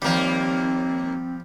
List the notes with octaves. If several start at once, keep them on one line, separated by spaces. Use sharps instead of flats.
D#2 F3 G3 A#3 C4